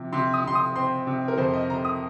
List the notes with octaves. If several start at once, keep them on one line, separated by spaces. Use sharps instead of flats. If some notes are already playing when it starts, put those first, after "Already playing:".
Already playing: C3 F3
C3 C6
D#6
C3 C6
D#6
C4 C6
C3
A#4
F2 C5
D#5
C3 A#5
D#6